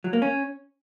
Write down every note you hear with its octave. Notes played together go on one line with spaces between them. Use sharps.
F#3
A#3
C#4